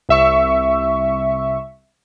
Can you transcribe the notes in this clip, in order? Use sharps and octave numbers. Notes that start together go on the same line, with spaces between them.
C2 E5 C#6